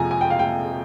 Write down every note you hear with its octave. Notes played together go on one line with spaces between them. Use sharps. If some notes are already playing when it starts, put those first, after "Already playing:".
Already playing: F2 C3 F3 G#5 A#5
G#5
G5
F5
G5